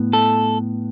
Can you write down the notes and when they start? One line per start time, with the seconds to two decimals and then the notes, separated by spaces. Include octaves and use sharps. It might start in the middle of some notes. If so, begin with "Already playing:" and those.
Already playing: A2 B3
0.13 A4